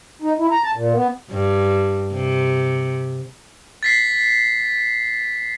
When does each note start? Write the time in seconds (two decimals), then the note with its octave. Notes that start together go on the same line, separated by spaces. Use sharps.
0.22 D#4
0.39 E4
0.51 A#5
0.64 A5
0.75 A#2
0.94 B3
1.31 G2
2.13 C3
3.83 A6 B6 C7